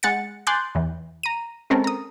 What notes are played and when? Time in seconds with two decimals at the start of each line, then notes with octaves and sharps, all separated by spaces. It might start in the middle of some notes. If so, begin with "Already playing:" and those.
0.03 G#3 F#5 A6 C#7
0.47 G#5 C6 D6 F#6 G6 A6
0.75 E2 E3
1.23 A#5 D#7
1.70 G#3 C4 C#4 A4 A#4
1.84 A#5 D#6